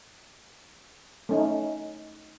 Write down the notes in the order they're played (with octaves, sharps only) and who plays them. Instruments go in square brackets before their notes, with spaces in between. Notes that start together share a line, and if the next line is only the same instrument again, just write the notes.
[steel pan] A3 C#4 D#4